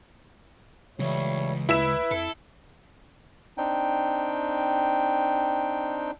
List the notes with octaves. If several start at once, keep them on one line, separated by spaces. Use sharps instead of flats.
C#2 E3 G3 A3 C#5
D2 E4 B4 E5 E7
F2 A4
C4 D4 D#4 G5